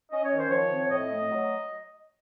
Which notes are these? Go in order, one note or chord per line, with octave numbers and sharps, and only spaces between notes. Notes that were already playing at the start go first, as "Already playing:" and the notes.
C#4 D#5
C#5
D#3
C5
F3 C#5
C4
C#5
A2 D#5
A3
F#3